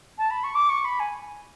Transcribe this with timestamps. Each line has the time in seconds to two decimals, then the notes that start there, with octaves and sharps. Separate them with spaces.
0.18 A5
0.30 B5
0.43 C#6
0.54 D6
0.69 C#6
0.84 B5
0.99 G#5